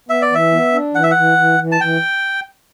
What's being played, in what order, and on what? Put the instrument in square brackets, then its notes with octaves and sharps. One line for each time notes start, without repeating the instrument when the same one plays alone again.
[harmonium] B3 [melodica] E5
[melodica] D5
[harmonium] E3 [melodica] E5
[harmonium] B3
D4
[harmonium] E3 [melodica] F#5
[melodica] E5
F#5
[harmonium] E3
E3
E3
[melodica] A5
[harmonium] E3 [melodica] G5